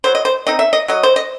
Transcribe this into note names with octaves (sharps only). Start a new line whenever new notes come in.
F#3 C5
D#5
C5
C4 D#4 D#5
E5
D#5
F#3 D#5
C5
D#5